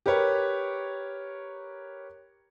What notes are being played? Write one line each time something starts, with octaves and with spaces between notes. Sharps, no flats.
G4 A#4 B4 C#5